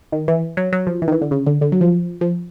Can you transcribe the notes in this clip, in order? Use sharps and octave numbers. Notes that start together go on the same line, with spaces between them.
D#3
E3
F#3
F#3
F3
E3
D#3
E3
D3
C#3
D3
D3
F#3
F3
F3